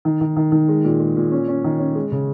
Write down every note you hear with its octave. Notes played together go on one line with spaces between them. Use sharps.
D#3
D#3
D#3
D#3
G#3
A#2
G#3
A#2
C#4
C#4
D#3
C#4
G#3
C#3